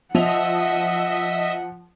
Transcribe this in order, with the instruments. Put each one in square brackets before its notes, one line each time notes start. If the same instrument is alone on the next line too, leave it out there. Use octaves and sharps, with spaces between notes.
[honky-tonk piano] F3 F7 [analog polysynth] D#5 E5 B6 [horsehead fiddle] F#5